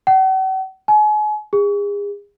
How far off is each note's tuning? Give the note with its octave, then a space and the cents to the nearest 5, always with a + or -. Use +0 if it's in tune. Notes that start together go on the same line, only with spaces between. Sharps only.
F#5 +45
G#5 +35
G#4 -35